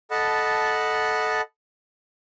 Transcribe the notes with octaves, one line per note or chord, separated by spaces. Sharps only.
A4 D#5 F#5 A5 B5